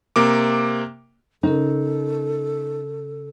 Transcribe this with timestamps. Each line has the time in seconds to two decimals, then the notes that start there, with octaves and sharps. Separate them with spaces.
0.16 C3 A#3 D6
1.43 C#3 C#4 D#4 A4 A#4